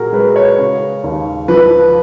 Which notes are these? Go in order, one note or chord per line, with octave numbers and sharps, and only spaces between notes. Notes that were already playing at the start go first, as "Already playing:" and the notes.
Already playing: A#2 F#4 G#4 A#4
G#3 B4
C#5
C#3
D#2
F3 B4